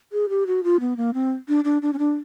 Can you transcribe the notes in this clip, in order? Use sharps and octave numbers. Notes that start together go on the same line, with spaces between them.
G#4
G4
F#4
F4
B3
A#3
C4
D4
D4
D4
C#4
D4